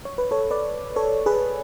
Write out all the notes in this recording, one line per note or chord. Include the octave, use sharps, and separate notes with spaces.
C#5
B4
A4 C#5
B4 D5
A4 C#5
G#4 B4